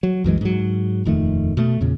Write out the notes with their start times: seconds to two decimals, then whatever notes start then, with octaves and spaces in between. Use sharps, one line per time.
0.03 F#3
0.24 C2 F#2 E3 G#3
0.41 G#2 F#3
1.05 D#1 F2 D#3 A3
1.57 B2 A3
1.81 E2 A#2 C#3